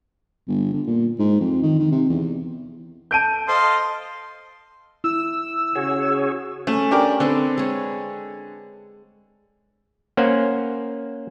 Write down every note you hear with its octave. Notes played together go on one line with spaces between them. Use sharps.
G1
D3
A#2
G#2
F2
D#3
D#3
C3
E2
A4 A5 G6 D7 D#7
A4 C5 D#5 F5 C6
E4 E6
C#3 F#4 G#4 C#5
A3 C#4
D4 G4 A#4
D3 C4 A4 B4
G#3 C#5
A#3 C#4 C5 F#5 G#5